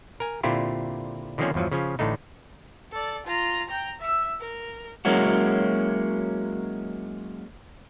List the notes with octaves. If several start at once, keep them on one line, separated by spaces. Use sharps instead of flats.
A#4 G#5
A#2 D3 C4 E4 F4 G4
D3 D#3 F3 A#3 C4 C#4
E2 G2 F3 F#3
C#3 F3 C#4
A1 A2 D3 A3 D#4
A4 D5
F4 A#5
G5 A#5
E5 E6
A#4
F#3 G#3 A#3 C#4 E4 F#4